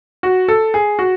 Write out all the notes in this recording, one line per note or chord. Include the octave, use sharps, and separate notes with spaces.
F#4
A4
G#4
F#4